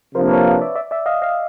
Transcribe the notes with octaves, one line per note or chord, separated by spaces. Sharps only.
C3 F3 A#3 D4 A#4 C5
B4 C#5
D5 E5
D5 E5
D5 E5
D#5 F5
D#5 F5